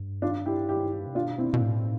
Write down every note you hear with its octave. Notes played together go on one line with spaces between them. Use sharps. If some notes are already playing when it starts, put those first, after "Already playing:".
Already playing: G2
D4 F4
E4 G4
E4 G4
C3
B2 D4 F4
C4 E4
B2
A2